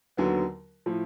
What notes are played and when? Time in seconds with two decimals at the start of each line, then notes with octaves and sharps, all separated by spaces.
0.17 D#2 D3 F#3 B3
0.86 A2 F3